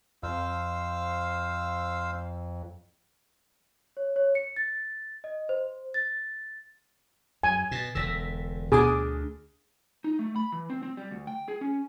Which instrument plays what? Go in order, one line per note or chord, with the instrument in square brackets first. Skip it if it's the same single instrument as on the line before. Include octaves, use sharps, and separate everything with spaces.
[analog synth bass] F2 [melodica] C5 F5 E6
[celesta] C#5
C#5
C#7
A6
D#5
C5
A6
[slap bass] F#2 [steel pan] G#5
[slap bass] B2 [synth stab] A6 E7
[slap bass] E1 D3 [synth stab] E6 A#6 B6
[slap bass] D2 D4 [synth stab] B2 D6 D#6 [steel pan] G#4
[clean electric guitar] D#4
A3
B5
E3
C4
C4
G3
D2
G5
G#4
C#4